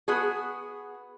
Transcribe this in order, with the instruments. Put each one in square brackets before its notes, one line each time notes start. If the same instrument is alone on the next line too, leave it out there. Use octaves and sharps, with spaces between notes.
[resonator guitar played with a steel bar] B3 F#4 G#4